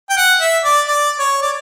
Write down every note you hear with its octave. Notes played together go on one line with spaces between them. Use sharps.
G5
F#5
E5
D5
D5
C#5
D5